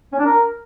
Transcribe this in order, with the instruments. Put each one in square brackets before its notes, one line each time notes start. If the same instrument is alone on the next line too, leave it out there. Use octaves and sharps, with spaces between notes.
[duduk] C#4
D4
A#4